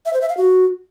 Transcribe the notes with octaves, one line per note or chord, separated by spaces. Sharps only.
E5
C5
E5
F5
F#4